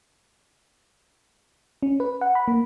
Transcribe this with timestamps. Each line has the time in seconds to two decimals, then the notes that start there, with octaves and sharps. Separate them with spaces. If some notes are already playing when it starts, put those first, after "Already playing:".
1.83 C#4
2.00 B4
2.21 F#5
2.35 B5
2.48 A#3